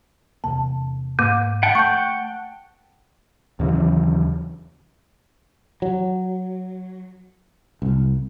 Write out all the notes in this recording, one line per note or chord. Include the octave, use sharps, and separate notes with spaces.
E2 C3 A#3 A5
G#2 A#3 D6
F#5 G5 A5
A3 C#6 G6
D#2 C#3 E3 F#3
F#3
C2